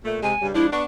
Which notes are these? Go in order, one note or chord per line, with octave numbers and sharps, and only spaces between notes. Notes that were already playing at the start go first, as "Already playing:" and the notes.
A#2 A3
C3 G#3 G#5
G2 C#3 G3
F3 G#3 D4 E4
B3 D4 C#6